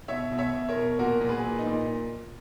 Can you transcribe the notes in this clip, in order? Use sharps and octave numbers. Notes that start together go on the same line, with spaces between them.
B2 C#5 E5
B2
C#5 E5
B2
A#4 C#5
B2
A#2 F#4 A#4
A#2
G#4 B4
A#2
D#4
A#2